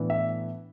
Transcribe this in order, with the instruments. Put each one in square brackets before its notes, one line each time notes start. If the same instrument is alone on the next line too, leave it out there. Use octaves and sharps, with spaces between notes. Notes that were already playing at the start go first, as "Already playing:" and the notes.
Already playing: [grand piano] A2 E3 B3 D4
E5